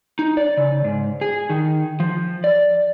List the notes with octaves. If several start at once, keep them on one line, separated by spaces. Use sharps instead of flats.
D#4
D5
C#3
G#2
G#4
D#3
F3
D5